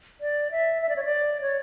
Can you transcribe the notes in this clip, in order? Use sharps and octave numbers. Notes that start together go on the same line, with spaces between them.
D5
E5
E5
D5
C#5
D5
C#5